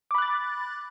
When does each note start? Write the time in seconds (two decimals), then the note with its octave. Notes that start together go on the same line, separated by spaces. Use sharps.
0.11 D6
0.14 B5
0.18 F#6
0.22 A6